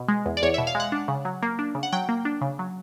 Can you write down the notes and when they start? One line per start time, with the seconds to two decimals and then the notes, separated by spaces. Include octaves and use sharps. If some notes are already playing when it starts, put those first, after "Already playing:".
Already playing: B2
0.08 G#3
0.26 E2
0.37 D5
0.43 E2 C#5
0.54 E5
0.58 B2
0.67 F5
0.75 G#3 F#5
0.92 D4
1.08 C#3
1.25 F#3
1.42 A#3
1.59 D4
1.75 C#3
1.83 F#5
1.93 F#3 G5
2.09 A#3
2.25 D4
2.41 C#3
2.59 F#3